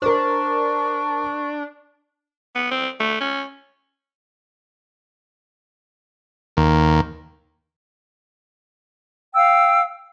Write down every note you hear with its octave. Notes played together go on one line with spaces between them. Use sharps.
D4 A#4 C5 C#6
B3
C4
A3
C#4
D#2
F5 G5 E6